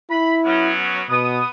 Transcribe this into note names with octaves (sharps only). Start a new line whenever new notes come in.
E4 B5
F#3 B3 C#4
B2 B3 D#6